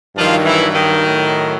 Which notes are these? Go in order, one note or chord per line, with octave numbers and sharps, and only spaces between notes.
G2 D#3 F3 F#3 F4
E3 E4
D#3 D#4
A2 F#3